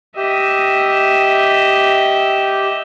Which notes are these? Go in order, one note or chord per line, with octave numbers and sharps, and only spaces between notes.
G4 D#5 E5